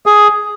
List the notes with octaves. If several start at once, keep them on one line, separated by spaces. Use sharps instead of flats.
G#4